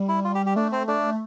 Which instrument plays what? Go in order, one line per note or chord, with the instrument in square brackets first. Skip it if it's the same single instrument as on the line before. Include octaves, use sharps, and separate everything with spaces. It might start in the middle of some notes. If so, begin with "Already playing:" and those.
Already playing: [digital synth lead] G3
[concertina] E4
F4
G4
G4
[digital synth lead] A3 [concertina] D4
[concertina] C4
[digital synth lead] A3 [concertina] D4